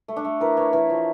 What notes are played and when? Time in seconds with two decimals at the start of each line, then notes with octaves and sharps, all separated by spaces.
0.08 A3
0.16 D4
0.25 A3
0.40 E3 A#4
0.57 E3 C#5
0.73 E3 A#4
0.90 F3